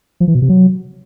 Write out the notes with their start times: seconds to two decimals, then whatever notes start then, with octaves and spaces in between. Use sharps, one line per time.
0.20 F3
0.28 E3
0.35 B2
0.42 C3
0.49 F#3